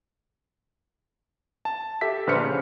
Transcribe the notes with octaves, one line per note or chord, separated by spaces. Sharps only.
A5
G4 A4 E5 B6
A#1 D3 B4 C5 F6 C#7
C#3